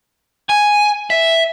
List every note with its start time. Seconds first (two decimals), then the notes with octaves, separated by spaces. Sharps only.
0.50 G#5
1.10 E5